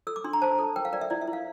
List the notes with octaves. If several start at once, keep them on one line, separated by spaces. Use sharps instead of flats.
A4 E6
D6
D4 C6
A#5
C5 A5
A4
A#4 G5
F5
A#4 D5
E5
E4 D5
E5
E4
F5